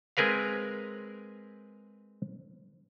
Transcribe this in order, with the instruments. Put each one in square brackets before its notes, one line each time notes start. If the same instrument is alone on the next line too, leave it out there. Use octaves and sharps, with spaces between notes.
[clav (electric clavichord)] G#3 C4 G#4 A#4 B4 F5